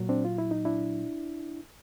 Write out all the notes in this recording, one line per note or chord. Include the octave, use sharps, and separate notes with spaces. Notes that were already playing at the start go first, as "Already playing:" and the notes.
Already playing: A#2 F#3
C4 D4
F4
E4
D#4
D4 E4